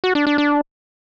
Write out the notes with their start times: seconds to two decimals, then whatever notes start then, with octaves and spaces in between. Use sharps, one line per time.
0.04 F#4
0.15 D4
0.27 D4
0.38 D4